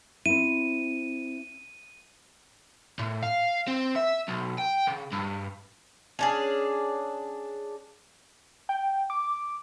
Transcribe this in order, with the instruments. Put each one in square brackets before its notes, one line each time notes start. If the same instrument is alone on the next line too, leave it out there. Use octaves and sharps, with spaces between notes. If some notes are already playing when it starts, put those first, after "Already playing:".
[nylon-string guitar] C4 E4 [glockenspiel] D#7
[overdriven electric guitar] A2
F5
C4
E5
B1
G5
C#3
G2
[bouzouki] C#4 D4 G#4
[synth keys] G5
D6